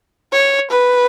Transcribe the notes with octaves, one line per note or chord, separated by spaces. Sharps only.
C#5
B4